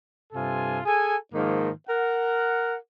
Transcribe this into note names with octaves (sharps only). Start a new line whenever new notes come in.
G2 C3 F4 A4 G#5
G#4 A4 G#5
G#2 D#3 F3 A#3
A#4 F#5